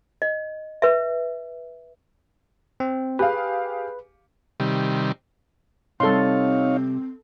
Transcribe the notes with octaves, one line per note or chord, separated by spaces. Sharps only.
D#5
B4 E5
C4
G4 G#4 B4 F5
C3 D#3 G3
C3 G3 C4 D#4 A4 C#5 F5 C6